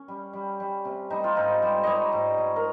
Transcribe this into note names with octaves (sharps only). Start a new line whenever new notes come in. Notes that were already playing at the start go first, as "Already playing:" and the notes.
Already playing: C#4
G3
G3
G3
C3
G3 D#4
F4
G#2 D#4
G3
G3 C#5 D#5
G#2
G#2
A#4